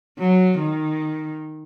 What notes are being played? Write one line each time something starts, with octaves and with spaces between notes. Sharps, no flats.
F#3
D#3